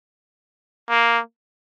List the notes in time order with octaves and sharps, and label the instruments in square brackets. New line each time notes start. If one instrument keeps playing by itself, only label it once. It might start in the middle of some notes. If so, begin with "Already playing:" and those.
[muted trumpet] A#3